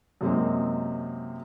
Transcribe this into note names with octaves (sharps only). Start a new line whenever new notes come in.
F#2 C3 G#3 A#3 C4 D#4